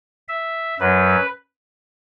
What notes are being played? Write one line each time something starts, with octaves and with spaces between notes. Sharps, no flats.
E5
F#2 F#3 B4